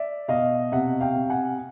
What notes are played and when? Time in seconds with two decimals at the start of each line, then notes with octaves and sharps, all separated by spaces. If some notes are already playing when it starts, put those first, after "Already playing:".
Already playing: D5 E5
0.28 B2 D#5 F5
0.72 C3 E5 F#5
1.00 F5 G5
1.15 C3
1.30 F#5 G#5